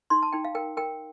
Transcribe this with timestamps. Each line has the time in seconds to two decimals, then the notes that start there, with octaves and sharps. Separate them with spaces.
0.10 D#4 C6
0.23 A5
0.32 D#4 G5
0.45 F5
0.55 A#4 G5
0.77 A#4 G5